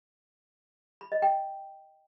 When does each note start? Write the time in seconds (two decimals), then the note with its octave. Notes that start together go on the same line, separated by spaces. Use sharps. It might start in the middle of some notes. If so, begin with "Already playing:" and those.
1.01 B5
1.12 D#5
1.22 G5